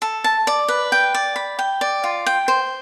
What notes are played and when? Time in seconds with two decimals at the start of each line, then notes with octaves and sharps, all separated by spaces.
0.02 A4
0.24 A5
0.47 D5
0.68 B4
0.92 G5
1.14 D5
1.36 B5
1.59 G5
1.81 D5
2.04 F4
2.26 G5
2.48 C5